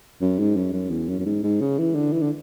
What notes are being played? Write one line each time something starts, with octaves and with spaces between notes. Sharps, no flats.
F#2
G#2
F#2
F#2
E2
F#2
F#2
G#2
G#2
C#3
E3
D3
E3
D3